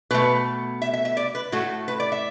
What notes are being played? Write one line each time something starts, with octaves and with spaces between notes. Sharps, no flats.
B2 A3 B4
E5
E5
E5
D5
B4
A2 A3 F#4
B4
D5
E5